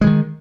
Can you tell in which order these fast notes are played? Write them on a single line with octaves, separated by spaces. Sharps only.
G#3 E3 D#3